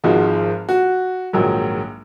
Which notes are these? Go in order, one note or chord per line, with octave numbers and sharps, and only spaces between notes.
G#1 G#2 F3 G#3 F#4
F#4
A#1 G#2 D#3 F#3